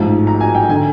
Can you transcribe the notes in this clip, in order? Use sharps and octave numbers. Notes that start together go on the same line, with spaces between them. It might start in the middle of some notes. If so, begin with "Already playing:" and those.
Already playing: A1 G#2 F3
A#5
G#5
G5
D3 G#5